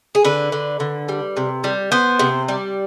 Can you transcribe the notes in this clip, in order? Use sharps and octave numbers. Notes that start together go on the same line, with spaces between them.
G#4
D3 B4
D3
D3
G3
C3
G3
B3 C5
C3
G3